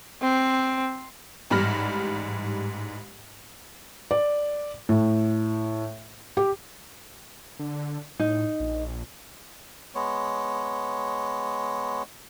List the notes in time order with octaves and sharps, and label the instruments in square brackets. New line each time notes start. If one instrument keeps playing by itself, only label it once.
[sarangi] C4
[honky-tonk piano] A1 G#2 G3 B5 F6 A#6
[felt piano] D5
A2
G4
[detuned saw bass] D3
[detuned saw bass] A2 [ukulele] D#4
[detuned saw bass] A#1
[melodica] G#3 B3 C#5